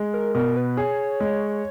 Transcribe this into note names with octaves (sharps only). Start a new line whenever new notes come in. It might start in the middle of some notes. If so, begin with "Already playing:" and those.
Already playing: G#3
A#4
B2 A#4
B4
G#4 C#5
G#3